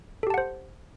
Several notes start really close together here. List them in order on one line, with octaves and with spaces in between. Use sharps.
A4 G4 A5 F#5 C5